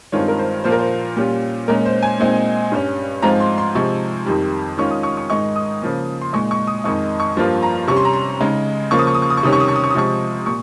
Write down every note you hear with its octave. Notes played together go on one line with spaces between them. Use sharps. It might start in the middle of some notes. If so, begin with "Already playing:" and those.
G2 D#3 G#3 C4 F4 C#5
A#4
C5
A#2 F3 A#3 F4 C5
A#4
C5
A#2 G3 C#4 F4
A#2 G#3 C#4 A#4
C5
G#5
A#2 G#3 C4 D#4
G2 G3 C#4
G#2 F3 G#3 C4 F4 A#5
C6
C6
C3 F3 G#3 C#6
F2 D#3 G3
D#3 G#3 C#4 F4 C#6
D#6
C#6
C#6
G#2 D#3 G#3 D#4 C#6
D#6
C#3 F3 A#3
C6
A#2 G#3 D#4 C#6
C#6
D#6
F2 D#3 G#3 D#4 C#6
C#6
G2 F3 A#3 F4
A#5
C3 G3 C#4 C#6
C6
A#5
C6
C#3 G#3 D#4
C#3 F3 A#3 C#6
D#6
C#6
D#6
C#6
D#6
C#6
C3 D#3 G3 C#4 D#6
C#6
D#6
C#6
D#6
C#6
D#6
C3 F3 G#3 C#6
A#2 C#6